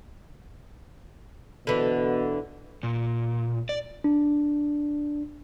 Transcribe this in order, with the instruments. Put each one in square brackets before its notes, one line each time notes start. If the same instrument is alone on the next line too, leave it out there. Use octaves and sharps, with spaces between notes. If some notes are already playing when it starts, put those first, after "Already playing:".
[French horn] B2 [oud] D3 E3
[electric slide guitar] A#2
D5
[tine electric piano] D4